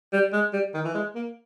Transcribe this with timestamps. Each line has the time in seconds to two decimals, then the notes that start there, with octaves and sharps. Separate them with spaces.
0.13 G3
0.33 G#3
0.53 G3
0.74 D#3
0.85 E3
0.94 G#3
1.15 A#3